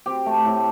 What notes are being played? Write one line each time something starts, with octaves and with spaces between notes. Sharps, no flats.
C4 G4
A3
A2